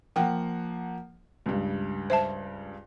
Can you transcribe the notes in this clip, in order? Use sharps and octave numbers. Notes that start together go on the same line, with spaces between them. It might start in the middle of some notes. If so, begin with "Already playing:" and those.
F3 A#3 F#5 G5
C#2 G2
C5 E5 A5